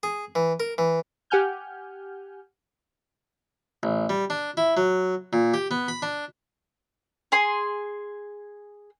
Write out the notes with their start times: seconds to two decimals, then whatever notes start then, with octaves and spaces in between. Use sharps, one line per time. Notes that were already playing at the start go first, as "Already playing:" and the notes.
0.03 G#4
0.35 E3
0.60 A#4
0.78 E3
1.30 G4 F#5 G#5 F6 G6
3.83 A1
4.09 G3
4.30 D4
4.57 E4
4.77 F#3
5.33 A#2
5.54 G4
5.71 B3
5.88 B5
6.02 D4
7.32 G#4 G#5 C6